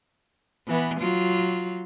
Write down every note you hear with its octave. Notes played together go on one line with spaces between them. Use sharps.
E3 B3
F#3 F4